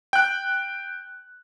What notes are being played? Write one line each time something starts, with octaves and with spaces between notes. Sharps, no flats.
G5 F#6